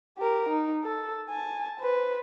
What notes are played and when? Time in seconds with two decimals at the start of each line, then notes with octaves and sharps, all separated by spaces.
0.18 G4 A#4
0.49 D#4
0.84 A4
1.30 G#5 A5
1.80 B4 C5